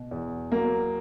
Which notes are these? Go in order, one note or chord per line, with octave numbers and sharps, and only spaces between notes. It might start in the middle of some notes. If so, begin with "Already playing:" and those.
Already playing: B2
E2
F#3 A#3